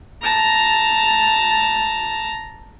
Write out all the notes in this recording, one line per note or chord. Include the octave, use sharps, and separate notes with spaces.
A5 A#5